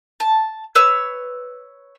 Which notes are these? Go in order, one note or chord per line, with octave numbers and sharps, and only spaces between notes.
A5
B4 C#5 E6